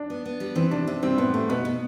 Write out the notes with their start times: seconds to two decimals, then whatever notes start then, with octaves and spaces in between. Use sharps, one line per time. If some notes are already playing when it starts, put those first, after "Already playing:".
Already playing: D4
0.10 B3
0.25 B3
0.40 G3
0.55 E3 C4
0.71 C3 D4
0.87 C3 C4
1.03 G3 C4
1.18 A2 B3
1.34 G3 A3
1.49 B2 B3
1.65 B2